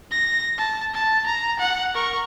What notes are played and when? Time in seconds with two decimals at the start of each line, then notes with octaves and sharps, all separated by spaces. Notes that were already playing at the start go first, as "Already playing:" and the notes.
0.11 A#6
0.58 A5
0.94 A5
1.26 A#5
1.59 F#5
1.94 A#4 C#6